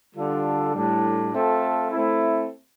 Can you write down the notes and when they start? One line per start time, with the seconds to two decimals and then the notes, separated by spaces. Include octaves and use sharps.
0.15 D3 G3 D4 F4 A4
0.74 A2 G3 D4
1.32 A3 C4 F4 A4
1.91 A3 C4 E4